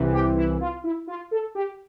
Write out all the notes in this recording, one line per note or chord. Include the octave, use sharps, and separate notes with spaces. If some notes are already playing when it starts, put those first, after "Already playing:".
Already playing: C2 C3 E3
G4
E4
F4
E4
F4
A4
G4